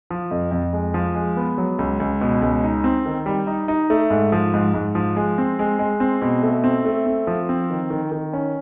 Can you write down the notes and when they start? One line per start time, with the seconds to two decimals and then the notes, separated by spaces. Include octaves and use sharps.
0.10 F3
0.31 F2
0.51 F2
0.73 G#3
0.94 F3
1.15 G#3
1.37 B3
1.58 F#3
1.79 C#2
2.00 C#2
2.21 B2
2.42 C#2
2.64 D#4
2.84 C4
3.06 D#3
3.26 G3
3.47 D#4
3.68 D#4
3.90 A3
4.10 G#2
4.32 F3
4.54 G#2
4.74 G#2
4.95 F3
5.16 G#3
5.38 C4
5.59 G#3
5.79 G#3
6.00 C4
6.22 B2
6.43 A3
6.64 C4
6.85 A3
7.06 C4
7.27 F3
7.49 C4
7.70 D#3
7.90 D#3
8.12 D#3
8.33 C#4